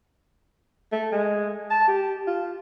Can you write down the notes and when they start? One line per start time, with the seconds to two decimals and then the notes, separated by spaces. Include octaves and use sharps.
0.92 A3
1.12 G#3
1.70 A5
1.88 G4
2.27 F4